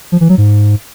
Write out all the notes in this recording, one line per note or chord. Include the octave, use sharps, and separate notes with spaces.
F3
E3
F#3
G#2